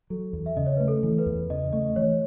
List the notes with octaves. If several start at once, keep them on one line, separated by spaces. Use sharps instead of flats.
F#3 A4
E2
E5
C#3 D#5
C#5
A3 B4
A4
E3
B4
E2
C#3 D#5
A3 D#5
E3 C#5